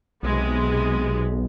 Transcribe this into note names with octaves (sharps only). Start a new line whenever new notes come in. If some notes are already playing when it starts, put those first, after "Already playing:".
B1 C3 G#3 B3